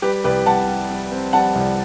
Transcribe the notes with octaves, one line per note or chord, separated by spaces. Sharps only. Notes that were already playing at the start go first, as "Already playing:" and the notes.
G3 G4 B4
C2 G4 B4
C2 F#5 A5
G3
G3
C4
G3 F#5 A5
C2